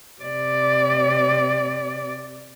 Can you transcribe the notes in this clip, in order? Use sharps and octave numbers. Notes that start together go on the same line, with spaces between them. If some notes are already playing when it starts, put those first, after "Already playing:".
C3 D5